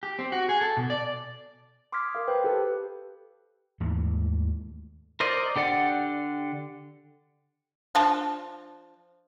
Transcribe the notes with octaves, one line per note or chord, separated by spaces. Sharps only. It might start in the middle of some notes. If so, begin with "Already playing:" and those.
G4
C4
F#4
G#4
A4
B2
D5
C6 D6 D#6 F6 G#6 B6
A#4 F5
B4 C5 G5
G4 A4
D#2 G#2 E3 A3
A#4 C5 D5 D#5
D3 G4 D5 F#5
F3 D4 A5